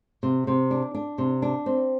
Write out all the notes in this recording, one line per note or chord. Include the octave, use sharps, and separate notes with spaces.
C3
C3
D4
D4
C3
D4
C4